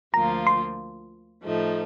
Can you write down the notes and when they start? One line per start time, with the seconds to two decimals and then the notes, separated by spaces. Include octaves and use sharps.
0.14 D2 D3 F3 A#3 F4 A#5
0.47 C6
1.44 A2 F3 A3 D#4